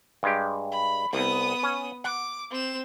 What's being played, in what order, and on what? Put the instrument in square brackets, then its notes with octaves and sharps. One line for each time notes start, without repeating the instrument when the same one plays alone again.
[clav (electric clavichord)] G2 G#3 G4
[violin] B5
[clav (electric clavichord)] C2 [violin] B3 D#6
[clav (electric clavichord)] C#4
[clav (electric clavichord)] F#5 [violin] D6
[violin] C4 E7